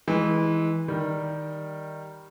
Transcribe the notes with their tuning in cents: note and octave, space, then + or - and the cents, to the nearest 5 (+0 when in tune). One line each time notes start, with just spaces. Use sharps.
E3 -20 G#3 +0
D#3 +0 G3 +0